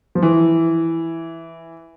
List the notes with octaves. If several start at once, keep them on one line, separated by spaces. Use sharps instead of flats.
F3
E3